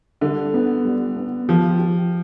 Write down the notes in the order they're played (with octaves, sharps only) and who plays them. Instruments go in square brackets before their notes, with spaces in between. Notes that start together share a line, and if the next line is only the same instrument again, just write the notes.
[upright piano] D3 [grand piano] G3
[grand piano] B3
G3
B3
[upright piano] F3 [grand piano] G4
[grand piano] G4